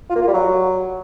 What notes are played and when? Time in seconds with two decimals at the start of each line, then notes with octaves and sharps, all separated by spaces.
0.10 F4
0.16 A#3
0.22 F4
0.28 G3
0.34 F#3